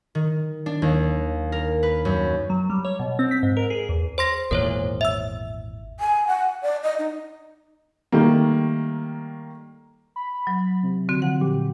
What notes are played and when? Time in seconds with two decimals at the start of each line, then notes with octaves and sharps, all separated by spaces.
0.15 D#3
0.66 D4
0.82 D#2
1.52 A#4
1.83 B4
2.05 F#2
2.50 F#3
2.70 G3
2.85 C#5
2.99 B2
3.19 C4
3.31 B6
3.43 G#2
3.57 A#4
3.70 G#4
3.89 E2
4.18 C5 C6 A#6
4.51 G#1 E2 A#2 A#4 C5 C#5
5.01 E5 E6
6.00 G#5
6.27 F#5
6.62 D5
6.83 D#5
6.98 D#4
8.12 D#3 G3 A3 A#3
10.16 B5
10.47 F#3
10.83 C3
11.09 D3 C4 F#4
11.22 F3 F#5
11.41 A#2 G4